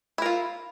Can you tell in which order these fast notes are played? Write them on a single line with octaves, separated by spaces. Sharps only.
E4 A#4 F4